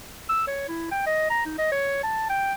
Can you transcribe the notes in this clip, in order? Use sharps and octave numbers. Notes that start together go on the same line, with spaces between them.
E6
C#5
E4
G5
D#5
A#5
D#4
D#5
C#5
A5
G5